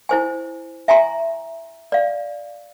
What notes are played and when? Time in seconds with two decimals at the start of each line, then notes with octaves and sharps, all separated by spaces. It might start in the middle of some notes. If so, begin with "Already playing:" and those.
0.09 E4 C5 G#5
0.88 E5 G#5 A#5 C6
1.92 D5 F5